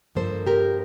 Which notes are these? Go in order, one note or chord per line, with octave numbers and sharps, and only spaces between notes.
G2 F3 A#3 A4 C5
G4 A#4